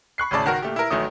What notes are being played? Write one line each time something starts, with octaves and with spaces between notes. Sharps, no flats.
B5 C#6 F#6 C7
G#1 A2 C#3 D5 A5
D#3 F#4 A#4
A#2 A3 G4
E4 A#4
A1 D#3 F#3 A3 D#6